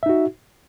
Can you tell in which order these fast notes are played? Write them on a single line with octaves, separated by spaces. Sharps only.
E5 D#4 F#4